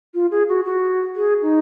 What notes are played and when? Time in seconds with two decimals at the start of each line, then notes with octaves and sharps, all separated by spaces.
0.14 F4
0.31 G#4
0.49 F#4
0.65 F#4
1.16 G#4
1.42 D#4